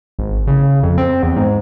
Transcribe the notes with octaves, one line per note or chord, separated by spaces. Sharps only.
G#1
C#3
F2
C4
E2
G#2